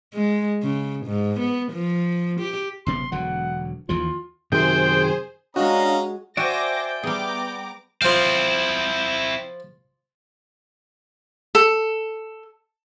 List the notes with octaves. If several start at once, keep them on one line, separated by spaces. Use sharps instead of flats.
G#3
C#3
G#2
B3
F3
G4
F#1 C3 B3 C6
E1 D3 F#3 F#5
D#2 E3 F3 F4
F#2 C3 D#3 G#4 C5 G5
G#3 C#4 D4 F#4 D#5 F5 A#5
F#4 C5 D5 E5 G5 G#5 D6 A#6
G3 B3 G#4 A#5 D6
F3 C4 E4 F5
A4